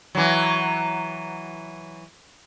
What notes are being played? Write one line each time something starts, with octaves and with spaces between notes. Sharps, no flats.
E3 F#3